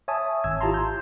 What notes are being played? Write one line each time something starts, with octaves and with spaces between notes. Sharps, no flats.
C#5 E5 G#5 A5 D#6
G#1 E6 G#6
E4 F4 G4 A5 A#5 C6
G6